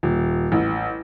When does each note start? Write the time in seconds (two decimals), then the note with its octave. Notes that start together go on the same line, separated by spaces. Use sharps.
0.03 D#1
0.52 A1